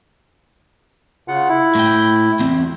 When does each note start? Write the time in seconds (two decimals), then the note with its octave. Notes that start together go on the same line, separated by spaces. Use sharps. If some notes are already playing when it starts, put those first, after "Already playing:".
1.28 C#3 F4 F#5
1.49 E4
1.75 A2 G5
2.39 E2 C4